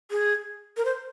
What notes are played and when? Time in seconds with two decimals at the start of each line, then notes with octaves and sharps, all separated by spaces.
0.11 G#4
0.77 A#4
0.85 C5